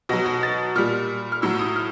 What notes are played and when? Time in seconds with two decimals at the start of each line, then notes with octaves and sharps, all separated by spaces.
0.09 B2 F#3 A#6
0.26 A#6
0.43 A6
0.75 A#2 G3 F6
1.32 F6
1.42 A2 F#3 E6
1.59 D#6
1.76 F6